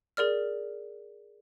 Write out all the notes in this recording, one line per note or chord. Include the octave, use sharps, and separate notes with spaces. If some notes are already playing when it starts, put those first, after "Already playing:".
G#4 A#4 D5 F6